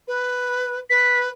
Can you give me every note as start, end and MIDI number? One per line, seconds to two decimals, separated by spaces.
0.07 0.79 71
0.90 1.29 71
0.90 1.19 95